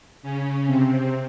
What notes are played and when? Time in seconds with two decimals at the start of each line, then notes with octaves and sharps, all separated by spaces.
0.23 C#3 C#4
0.67 C3 C4